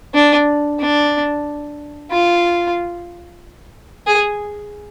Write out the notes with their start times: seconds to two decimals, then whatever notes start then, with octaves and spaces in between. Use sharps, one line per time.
0.14 D4
0.80 D4
2.10 F4
4.07 G#4